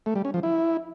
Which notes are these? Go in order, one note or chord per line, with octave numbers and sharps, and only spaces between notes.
A3
G3
C#4
F3
E4